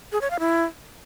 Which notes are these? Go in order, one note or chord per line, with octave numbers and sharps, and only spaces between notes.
G#4
C#5
F5
E4